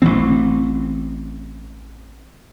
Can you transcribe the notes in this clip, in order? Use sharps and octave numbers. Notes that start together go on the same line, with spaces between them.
A1 D#3 E3 C4